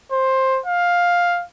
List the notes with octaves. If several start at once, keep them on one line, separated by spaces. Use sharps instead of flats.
C5
F5